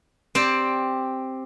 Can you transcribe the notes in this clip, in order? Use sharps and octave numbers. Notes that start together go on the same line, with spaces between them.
C4 G4 D5